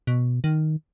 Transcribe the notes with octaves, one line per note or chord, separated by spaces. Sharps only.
B2
D#3